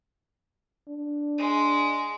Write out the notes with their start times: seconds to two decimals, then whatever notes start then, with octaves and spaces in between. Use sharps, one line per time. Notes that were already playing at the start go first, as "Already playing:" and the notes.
0.88 D4
1.38 G#3